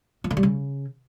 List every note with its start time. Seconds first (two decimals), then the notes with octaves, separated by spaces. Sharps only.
0.24 F3
0.31 D3
0.37 G3
0.43 C#3